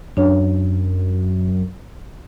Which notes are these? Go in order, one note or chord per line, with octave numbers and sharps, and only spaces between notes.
F#2 D4 C#5